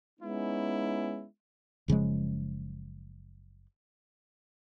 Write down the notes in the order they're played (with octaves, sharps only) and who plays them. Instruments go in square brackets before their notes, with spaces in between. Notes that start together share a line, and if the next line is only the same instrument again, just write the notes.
[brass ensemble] G#3 B3 C#4 D#4 E4
[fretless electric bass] F#1 C#3 F3 G#3